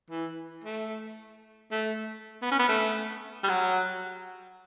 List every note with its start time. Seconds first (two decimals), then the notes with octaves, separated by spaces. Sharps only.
0.10 E3
0.64 A3
1.71 A3
2.42 B3
2.51 C#4
2.59 B3
2.69 A3
3.43 G3
3.49 F#3